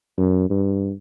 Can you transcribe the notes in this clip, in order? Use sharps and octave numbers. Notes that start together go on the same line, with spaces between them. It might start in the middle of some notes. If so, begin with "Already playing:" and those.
F#2
G2